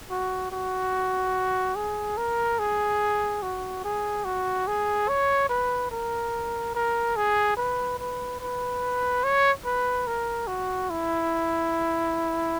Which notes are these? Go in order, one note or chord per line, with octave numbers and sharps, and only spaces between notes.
F#4
F#4
G#4
A#4
G#4
F#4
G#4
F#4
G#4
C#5
B4
A#4
A#4
G#4
B4
B4
B4
C#5
B4
A#4
F#4
E4